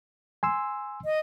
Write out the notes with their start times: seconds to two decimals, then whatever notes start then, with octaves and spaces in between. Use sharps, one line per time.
0.43 G#5 C6 E6
1.05 D#5